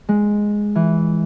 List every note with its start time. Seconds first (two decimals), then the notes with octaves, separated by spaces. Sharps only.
0.09 G#3
0.75 E3